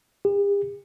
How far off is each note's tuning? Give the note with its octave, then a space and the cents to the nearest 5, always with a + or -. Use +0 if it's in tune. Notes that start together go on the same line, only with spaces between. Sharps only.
G4 +45